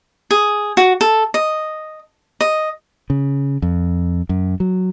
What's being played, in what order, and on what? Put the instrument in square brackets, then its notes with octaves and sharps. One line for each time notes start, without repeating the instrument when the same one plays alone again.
[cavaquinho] G#4
F#4
A4
D#5
D#5
[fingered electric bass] C#3
F2
F#2
F#3